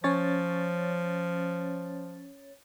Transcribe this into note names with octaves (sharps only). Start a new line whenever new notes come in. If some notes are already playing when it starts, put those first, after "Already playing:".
F3 C#4 C#5 A6